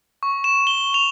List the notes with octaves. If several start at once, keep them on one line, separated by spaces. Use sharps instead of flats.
C#6
E7
G7
F7